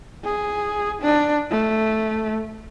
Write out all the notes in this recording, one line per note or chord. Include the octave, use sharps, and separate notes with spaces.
G#4
D4
A3